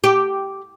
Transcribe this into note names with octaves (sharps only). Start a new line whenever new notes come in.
G4